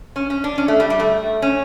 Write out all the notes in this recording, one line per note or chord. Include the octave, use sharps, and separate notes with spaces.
C#4
C#4
D4
C#4
A3
G3
G3
A3
C#4